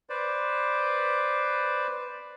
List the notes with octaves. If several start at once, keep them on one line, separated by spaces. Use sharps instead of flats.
B4 C5 D5